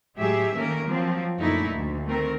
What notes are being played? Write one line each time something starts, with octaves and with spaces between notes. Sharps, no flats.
A2 F#3 G#3 G4 G#4 E5
D#3 A3 A#3 C#4 A#4
F3 F#3 C4
F#2 A#2 D3 A3 D#4 E4
D2
D#3 A3 C4 A#4